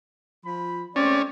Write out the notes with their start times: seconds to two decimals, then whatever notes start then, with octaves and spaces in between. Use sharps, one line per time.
0.45 F3 B5
0.96 G#3 A3 C4 C#4 D5